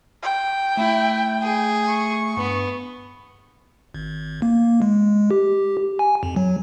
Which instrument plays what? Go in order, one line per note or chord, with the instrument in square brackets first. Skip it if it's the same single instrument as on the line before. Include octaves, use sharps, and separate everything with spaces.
[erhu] G5
[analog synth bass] A3 [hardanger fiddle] E4
[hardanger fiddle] G#4
[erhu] C#6
[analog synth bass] G2 [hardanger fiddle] B3
[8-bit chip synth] G#1
A#3
G#3
G4
G#5
F2
F#3